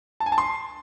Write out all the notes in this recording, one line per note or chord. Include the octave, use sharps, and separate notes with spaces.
A5
G#5
A5
C6